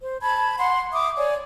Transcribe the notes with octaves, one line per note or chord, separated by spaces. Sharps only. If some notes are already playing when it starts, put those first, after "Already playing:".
C5
A5 B5 G#6
F#5 C6
E5 D6 D#6
C#5 D5 G#5